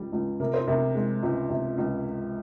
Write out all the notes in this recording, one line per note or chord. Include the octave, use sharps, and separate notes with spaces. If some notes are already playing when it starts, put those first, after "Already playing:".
Already playing: C#2 G3
C#2
C3 A#4
C5
C3 A#4
G#3
C#2
C3
C#2